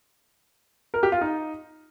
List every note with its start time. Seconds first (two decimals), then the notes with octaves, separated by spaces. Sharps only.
0.94 A#4
1.03 G4
1.12 F4
1.21 D#4